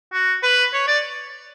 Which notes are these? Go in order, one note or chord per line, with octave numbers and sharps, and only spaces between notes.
F#4
B4
C#5
D5